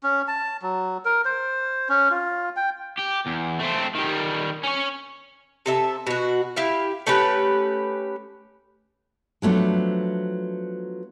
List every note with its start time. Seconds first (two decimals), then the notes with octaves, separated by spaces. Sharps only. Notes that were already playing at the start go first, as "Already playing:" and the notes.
0.03 C#4
0.28 A5
0.62 F#3
1.05 A#4
1.25 C5
1.89 C#4
2.10 F4
2.56 G5
2.98 G4
3.26 E2
3.59 A3 C4
3.95 D#3 G3
4.64 C#4 C#5
5.66 C3 A4 E5
6.07 B2 F#4
6.56 E4 G4 F5
7.07 A3 C#4 G4 B4
9.42 F3 F#3 A3 B3 D4